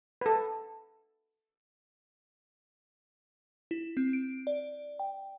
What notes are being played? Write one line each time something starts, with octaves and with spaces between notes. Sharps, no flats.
A4 B4
E4
C4
D7
D5
G5